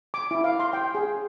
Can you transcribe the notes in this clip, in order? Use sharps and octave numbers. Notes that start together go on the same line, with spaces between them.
D6
E4
F5
C6
G5
G#4